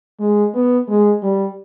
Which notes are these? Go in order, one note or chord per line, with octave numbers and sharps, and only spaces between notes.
G#3
B3
G#3
G3